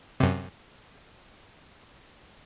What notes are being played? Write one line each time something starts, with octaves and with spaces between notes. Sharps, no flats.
F#2 C3